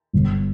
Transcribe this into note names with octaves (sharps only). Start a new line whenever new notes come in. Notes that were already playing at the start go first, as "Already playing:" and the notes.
G1